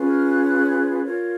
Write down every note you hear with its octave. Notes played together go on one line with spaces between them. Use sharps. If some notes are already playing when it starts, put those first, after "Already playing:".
Already playing: C#4 F4 G#4 B4
F6
F#6
F#6
F#6
F4 A#4 C#5